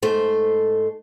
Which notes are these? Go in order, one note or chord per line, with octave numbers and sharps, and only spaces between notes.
G#2 A3 C5